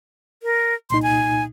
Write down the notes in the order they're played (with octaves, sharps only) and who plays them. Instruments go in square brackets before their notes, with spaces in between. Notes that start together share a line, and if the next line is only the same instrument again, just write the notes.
[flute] A#4
[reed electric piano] C2 A#2 D#4 [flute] C6
[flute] G#5